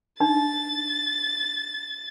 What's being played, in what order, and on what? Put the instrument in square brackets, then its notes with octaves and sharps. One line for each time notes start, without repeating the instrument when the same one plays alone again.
[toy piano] D4 D#4 [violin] A6